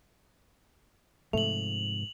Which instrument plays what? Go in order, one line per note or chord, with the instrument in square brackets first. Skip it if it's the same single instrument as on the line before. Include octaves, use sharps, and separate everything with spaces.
[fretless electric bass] G#2 C3 F3 [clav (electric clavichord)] A3 [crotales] F7 F#7